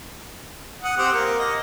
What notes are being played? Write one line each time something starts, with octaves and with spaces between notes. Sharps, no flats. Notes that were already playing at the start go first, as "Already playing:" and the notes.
F#5 D#6
C4 G4 F#5
A#3
D#5